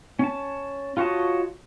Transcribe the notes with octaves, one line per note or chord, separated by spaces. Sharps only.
C#4 A5
F4 F#4 C#5 D#5 A5